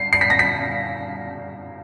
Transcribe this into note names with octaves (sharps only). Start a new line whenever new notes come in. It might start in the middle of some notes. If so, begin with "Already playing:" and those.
Already playing: C7
C7
B6
A#6
B6